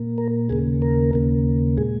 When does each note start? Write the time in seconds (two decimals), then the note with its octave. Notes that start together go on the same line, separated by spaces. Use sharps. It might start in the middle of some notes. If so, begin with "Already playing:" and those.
Already playing: A#2 A#3
0.18 A#4
0.49 D#2 C#3 A#3 G#4
0.82 A#4
1.13 D#2 C#3 A#3
1.77 A#2 G#3 G#4